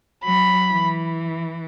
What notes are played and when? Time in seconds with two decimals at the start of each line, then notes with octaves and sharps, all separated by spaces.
0.24 F#3 B5
0.71 E3